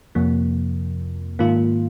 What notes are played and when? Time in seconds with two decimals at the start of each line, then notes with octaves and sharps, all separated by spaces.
0.15 F2 C3 F3 A#3
1.39 G#2 D#3 A#3 F4